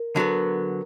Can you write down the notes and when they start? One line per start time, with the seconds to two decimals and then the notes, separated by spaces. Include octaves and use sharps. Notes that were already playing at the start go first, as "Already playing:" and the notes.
Already playing: A#4
0.16 D3 F#3 B3